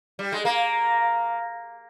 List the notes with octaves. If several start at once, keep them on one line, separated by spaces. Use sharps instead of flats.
G3
G#3
A#3